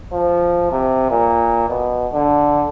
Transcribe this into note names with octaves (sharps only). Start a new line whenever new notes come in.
F3
C3
A#2
B2
D3